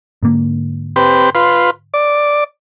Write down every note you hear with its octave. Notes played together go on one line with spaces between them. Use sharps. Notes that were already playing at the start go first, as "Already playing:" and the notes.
G#2 D3 A#3
C4 G4 B4
F4 B4 C6
D5